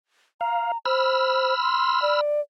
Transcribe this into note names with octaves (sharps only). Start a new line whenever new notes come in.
F5 A#5
C5 B5 E6 F6
C6
D5